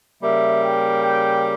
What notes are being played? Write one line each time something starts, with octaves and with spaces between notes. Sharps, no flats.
C#3 G3 A#3 E5
G5
G5